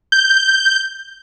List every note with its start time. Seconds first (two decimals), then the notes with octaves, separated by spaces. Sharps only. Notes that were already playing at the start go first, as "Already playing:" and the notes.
0.12 G6